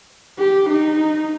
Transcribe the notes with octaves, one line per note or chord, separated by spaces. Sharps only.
G4
D#4